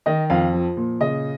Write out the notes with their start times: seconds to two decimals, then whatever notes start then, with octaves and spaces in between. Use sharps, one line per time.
0.06 D#3 D#5
0.30 F2 F5
0.53 F3
0.77 A#2
1.01 C#3 D#5